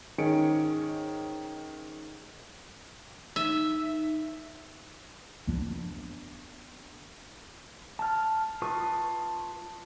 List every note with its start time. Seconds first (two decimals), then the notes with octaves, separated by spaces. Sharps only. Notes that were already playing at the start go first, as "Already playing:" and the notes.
0.18 G#2 D#3 C#4 G#4 C#7 D7
3.36 D#4 E5
5.47 B3 D4
7.99 A5 F6
8.62 F4 B4 A5 C#6 D#6